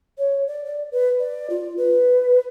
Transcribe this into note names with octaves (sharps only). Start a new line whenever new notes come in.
C#5
D5
D5
B4
D5
F4
B4